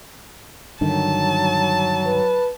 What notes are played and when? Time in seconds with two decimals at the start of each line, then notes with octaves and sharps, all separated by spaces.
0.81 G2 D3 D#3 F#3 A5
2.06 B4